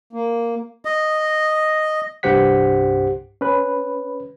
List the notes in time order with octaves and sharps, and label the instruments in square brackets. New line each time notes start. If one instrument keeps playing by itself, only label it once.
[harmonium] A#3
[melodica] D#5
[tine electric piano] C2 G2 G4 C5 F#5 B6
[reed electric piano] C#4 B4